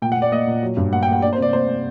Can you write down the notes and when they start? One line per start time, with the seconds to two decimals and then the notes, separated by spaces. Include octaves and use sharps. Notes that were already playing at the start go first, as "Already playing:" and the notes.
0.02 A#2 G5
0.12 F#5
0.17 A#2 D5
0.32 A#3 D#5
0.47 A#2
0.63 F#3
0.77 G2
0.92 A#3 F#5
1.03 G5
1.08 A#3
1.13 F#5
1.22 A#3 D5
1.33 C5
1.38 C3 D5
1.53 A#3 C5
1.68 A#3